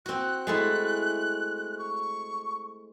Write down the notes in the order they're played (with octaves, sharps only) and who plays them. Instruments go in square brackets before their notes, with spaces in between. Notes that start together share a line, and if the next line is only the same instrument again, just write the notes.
[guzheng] C4 F#4 [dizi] F#6
[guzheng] G#3 A3 E4
[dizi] C#6